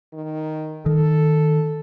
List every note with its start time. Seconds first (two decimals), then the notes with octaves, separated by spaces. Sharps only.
0.14 D#3
0.86 D#3 A4